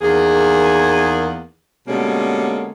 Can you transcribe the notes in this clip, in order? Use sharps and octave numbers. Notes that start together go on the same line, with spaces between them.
E2 D#3 A#3 G#4
B2 D3 G3 G#3 A#3 C#4